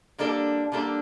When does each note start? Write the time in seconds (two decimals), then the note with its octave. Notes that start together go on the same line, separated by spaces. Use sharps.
0.18 D3 G3 A#3 D4 A4
0.72 D3 G3 A#3 D4 A4